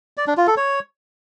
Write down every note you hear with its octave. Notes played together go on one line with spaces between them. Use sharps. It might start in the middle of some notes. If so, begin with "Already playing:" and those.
D5
D4
F4
A4
C#5